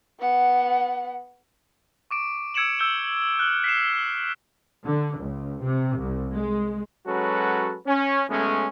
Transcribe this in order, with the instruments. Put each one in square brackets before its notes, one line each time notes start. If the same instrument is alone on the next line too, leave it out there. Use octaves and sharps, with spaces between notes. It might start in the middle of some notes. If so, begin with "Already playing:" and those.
[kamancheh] B3 F#5
[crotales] C#6 D6 D7
E6 G#6 C#7 D7 E7 F#7
E6 G6 E7 G7
F6 F#6
B6 C7 E7
[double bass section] D3
C#2
C3
C2
G#3
[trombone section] F#3 G#3 C#4 F#4 A4 B4
C#4
B1 G#3 A3 B3 C#4